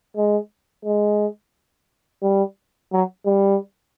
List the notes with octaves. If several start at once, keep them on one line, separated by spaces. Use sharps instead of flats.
G#3
G#3
G3
F#3
G3